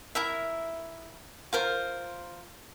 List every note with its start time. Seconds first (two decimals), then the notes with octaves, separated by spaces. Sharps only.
0.15 E4 A#4 E5
1.53 F4 A#4 C5